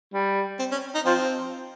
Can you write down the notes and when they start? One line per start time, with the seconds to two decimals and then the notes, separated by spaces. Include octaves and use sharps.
0.14 G3
0.59 C4
0.71 C#4
0.95 D#4
1.05 F3 C4